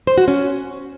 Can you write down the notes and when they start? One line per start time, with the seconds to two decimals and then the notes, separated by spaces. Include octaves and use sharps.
0.07 C5
0.18 F#4
0.28 C#4